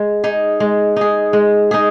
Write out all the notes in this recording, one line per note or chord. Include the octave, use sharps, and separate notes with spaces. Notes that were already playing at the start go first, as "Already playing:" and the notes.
Already playing: G#3
D#4 G#4
G#3
D#4 G#4
G#3
D#4 G#4